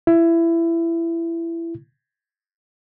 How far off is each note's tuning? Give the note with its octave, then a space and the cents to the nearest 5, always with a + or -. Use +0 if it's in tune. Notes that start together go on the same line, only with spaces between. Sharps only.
E4 +20